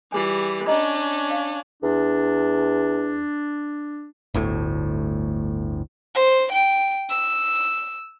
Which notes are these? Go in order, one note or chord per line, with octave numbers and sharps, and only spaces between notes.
E3 G3 F4 G#4 G#5
C#4 D4 D#5 A#5
F5
E2 D4
G1 D2 A2
C5
G5
E6